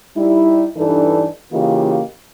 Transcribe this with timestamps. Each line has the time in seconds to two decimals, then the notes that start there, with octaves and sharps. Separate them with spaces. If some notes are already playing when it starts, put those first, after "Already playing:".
0.16 G3 D#4 E4
0.77 G2 E3 D4 D#4 A4 B4
1.53 C#3 E3 A#3 F4 G4 D#5